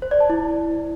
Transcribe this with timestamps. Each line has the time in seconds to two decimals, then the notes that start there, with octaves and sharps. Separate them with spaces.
0.02 C5
0.11 D5
0.20 A5
0.30 E4